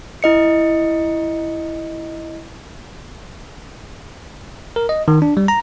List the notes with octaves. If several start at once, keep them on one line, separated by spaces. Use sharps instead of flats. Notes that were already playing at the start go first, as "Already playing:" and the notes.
E4 D#5 C#7
A#4
D#5
D#3
D4
G3
A#5